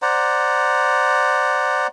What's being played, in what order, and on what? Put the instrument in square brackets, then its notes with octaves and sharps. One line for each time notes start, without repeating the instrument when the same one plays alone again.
[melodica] C5 D5 F#5 A#5